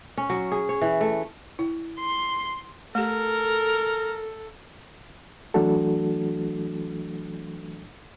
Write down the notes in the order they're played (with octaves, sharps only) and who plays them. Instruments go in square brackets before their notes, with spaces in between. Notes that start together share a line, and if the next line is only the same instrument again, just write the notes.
[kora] C#4
F#3
G#4
C#5
E3
A3
[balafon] E4
[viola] C6
[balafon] A3 G4 [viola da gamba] A4 [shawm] A#4
[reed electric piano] E3 F#3 A3 D4 F#4 A4